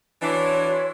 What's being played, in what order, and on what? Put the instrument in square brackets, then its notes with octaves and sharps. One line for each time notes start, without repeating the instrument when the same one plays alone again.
[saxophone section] E3 D4 [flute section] F#4 C#5 C6